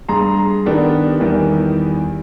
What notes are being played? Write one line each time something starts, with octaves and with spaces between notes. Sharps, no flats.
G2 G#4 A#5 C6
D#3 B3 D4 G4 A4 A#4
E2 D#3 E3 G3